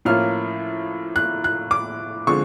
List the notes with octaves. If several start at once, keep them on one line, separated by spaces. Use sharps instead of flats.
A2 F3 A#3 C#4 F4 F6
F#6
F#6
D6
D3 F3 G#3 C4 C#6